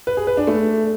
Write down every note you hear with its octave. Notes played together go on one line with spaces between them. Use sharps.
B4
G#4
B4
D4
A3